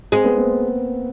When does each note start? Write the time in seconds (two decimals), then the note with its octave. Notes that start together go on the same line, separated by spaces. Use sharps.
0.12 G#3 C4
0.25 B3
0.37 A#3 C4